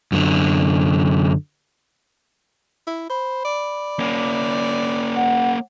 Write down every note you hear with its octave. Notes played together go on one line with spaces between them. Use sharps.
F#2 D3
E4
C5 B5
D5
A#3 C#4
F#5